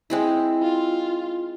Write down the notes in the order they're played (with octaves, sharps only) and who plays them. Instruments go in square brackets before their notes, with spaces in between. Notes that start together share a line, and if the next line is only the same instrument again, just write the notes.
[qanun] G#3 C4 E4
[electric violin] F4